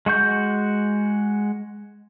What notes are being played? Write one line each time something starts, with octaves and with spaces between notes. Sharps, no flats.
G#3 F#4 C#6 G6